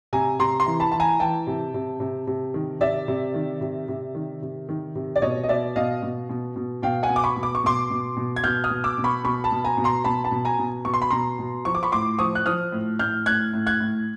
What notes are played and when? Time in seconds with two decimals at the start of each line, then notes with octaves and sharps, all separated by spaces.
0.13 C3 G#5 A#5
0.39 C3 A#5 C6
0.60 A#5 C6
0.66 E3
0.80 A5 B5
0.92 E3 A5
1.00 G#5 A#5
1.19 E3 G5 A5
1.47 C3
1.74 C3
2.00 C3
2.27 C3
2.54 D#3
2.81 C3 D5 E5
3.08 C3
3.34 D#3
3.61 C3
3.88 C3
4.15 D#3
4.42 C3
4.69 D#3
4.95 C3
5.16 D5
5.22 B2 C#5 D#5
5.44 D#5
5.49 B2 D5 E5
5.76 B2 D#5 F5
6.03 B2
6.29 B2
6.56 B2
6.83 B2 F5 G5
7.03 F#5 G#5
7.09 B2
7.16 D6
7.24 B5 C#6
7.36 B2
7.43 D6
7.55 C#6
7.64 B2 C6 D6
7.90 B2
8.17 B2
8.36 G#6
8.44 B2 F6 G6
8.64 D#6 F6
8.70 B2
8.84 D6 E6
8.98 B2
9.04 B5 C#6
9.24 B2 B5 C#6
9.44 A5 B5
9.52 B2
9.65 G#5 A#5
9.77 B2
9.84 A#5 C6
10.04 B2 A5 B5
10.24 A5 B5
10.31 B2
10.45 G#5 A#5
10.59 B2
10.85 B2 C#6
10.94 C6
11.02 B5
11.10 B2 A#5 C6
11.39 B2
11.65 F3 C#6
11.75 D6
11.83 B5 C#6
11.92 A2 C6 D6
12.19 F3 C#6 D#6
12.35 F#6
12.46 F3 D#6 F6
12.72 A2
12.99 A2 F6 G6
13.26 A2 F#6 G#6
13.53 A2
13.66 F#6 G#6
13.80 A2